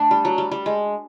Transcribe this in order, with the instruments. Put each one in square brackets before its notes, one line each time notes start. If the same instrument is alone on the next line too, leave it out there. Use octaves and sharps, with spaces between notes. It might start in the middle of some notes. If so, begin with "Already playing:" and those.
Already playing: [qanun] A3 [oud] D4
[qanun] G3
F#3
G3
G3
G#3